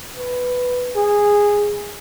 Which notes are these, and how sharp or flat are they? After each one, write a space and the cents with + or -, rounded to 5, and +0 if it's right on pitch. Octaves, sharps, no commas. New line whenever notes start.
B4 +5
G#4 -10